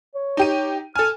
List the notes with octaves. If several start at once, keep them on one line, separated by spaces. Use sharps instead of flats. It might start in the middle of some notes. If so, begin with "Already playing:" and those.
C#5
D#4 G4 D#7
A4 G#5 F6